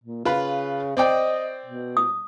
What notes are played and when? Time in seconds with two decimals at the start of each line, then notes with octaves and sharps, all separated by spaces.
0.04 A#2
0.25 C#3 F4 B4
0.97 C4 D5 D#5 G5
1.66 B2
1.97 D#6